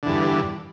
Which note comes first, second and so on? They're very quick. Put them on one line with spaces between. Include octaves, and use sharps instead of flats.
D3 E2 G2